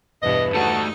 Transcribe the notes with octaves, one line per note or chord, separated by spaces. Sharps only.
E2 G2 B2 B4 D#5
A3 D#4 F#4 A5